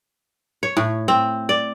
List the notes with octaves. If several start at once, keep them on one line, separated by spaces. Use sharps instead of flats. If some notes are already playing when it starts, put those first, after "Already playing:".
C#5
A2
C4
D5